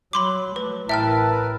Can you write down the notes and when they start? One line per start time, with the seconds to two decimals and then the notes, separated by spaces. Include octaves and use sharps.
0.13 F#3 B5 C6 D6
0.56 F#3 A3 B4
0.89 A1 E4 A#4 B4 E5 G5 A5 F6